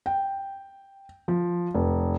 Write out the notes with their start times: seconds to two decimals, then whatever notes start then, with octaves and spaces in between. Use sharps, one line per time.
0.06 G5
1.28 F3
1.74 F1